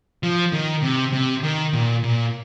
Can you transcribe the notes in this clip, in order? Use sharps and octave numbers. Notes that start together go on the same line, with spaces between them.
F3
D#3
C3
C3
D#3
A#2
A#2